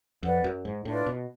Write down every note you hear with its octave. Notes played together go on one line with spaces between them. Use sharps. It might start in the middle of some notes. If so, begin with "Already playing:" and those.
F2 B4 D5 F#5
F#2
G#2
A2 D4 F4 B4 D5
B2